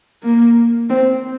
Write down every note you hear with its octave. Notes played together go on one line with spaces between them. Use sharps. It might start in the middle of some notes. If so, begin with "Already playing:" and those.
A#3
C4